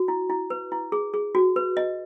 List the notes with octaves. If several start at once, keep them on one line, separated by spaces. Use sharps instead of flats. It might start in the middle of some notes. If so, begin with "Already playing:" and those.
Already playing: F#4
E4
E4
B4
E4
G#4
G#4
F#4
B4
D#5